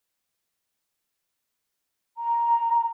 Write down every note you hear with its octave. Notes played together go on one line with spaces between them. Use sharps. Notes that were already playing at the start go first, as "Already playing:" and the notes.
A#5